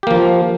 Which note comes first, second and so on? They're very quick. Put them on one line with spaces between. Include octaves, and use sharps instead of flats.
G4 A#3 F3